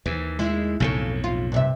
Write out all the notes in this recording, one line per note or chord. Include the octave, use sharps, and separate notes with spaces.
D#2 E3
G#3 E4
B1 F2 A2 C#3 G#4 A4
F4
G2 C3 E5